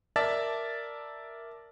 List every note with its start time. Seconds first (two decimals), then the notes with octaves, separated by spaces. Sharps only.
0.16 A#4 D5 E5 A5 A6